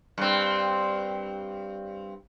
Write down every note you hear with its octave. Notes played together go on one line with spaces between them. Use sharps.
G2 C4